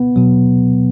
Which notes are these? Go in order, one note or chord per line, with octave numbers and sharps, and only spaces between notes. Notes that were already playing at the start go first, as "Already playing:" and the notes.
Already playing: B3
B2 F#3